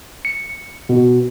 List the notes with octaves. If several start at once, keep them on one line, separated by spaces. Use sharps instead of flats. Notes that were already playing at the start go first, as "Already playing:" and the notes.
C#7
B2